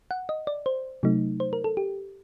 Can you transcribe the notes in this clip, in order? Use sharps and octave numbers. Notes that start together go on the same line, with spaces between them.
F#5
D#5
D5
C5
C3 F#3 A3 D#4
C5
A#4
A4
G4